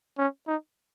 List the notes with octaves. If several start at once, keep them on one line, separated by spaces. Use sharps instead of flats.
C#4
D#4